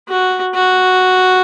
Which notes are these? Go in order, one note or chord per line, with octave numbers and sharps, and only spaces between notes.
F#4
F#4